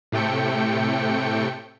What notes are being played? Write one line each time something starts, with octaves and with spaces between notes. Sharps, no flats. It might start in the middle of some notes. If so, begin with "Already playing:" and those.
A2 C3 A3 G5 C#7